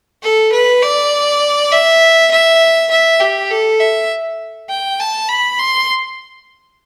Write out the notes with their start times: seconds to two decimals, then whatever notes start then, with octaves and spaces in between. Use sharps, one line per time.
0.23 A4
0.52 B4
0.83 D5
1.72 E5
2.31 E5
2.91 E5
3.20 G4
3.51 A4
3.80 E5
4.70 G5
5.00 A5
5.29 B5
5.59 C6